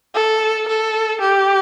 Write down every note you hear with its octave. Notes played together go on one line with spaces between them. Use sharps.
A4
A4
G4